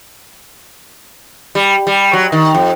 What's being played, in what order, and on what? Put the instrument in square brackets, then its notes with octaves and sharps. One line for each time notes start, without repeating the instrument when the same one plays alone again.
[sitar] G3
G3
F#3
D#3
F2